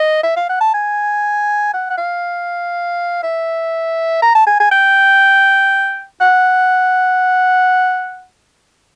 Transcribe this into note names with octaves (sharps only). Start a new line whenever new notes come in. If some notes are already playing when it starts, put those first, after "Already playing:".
Already playing: D#5
E5
F5
F#5
A5
G#5
F#5
F#5
F5
E5
A#5
A5
G#5
G#5
G5
F#5